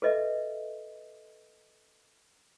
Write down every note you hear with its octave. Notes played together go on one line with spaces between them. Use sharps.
A4 B4 D#5 E5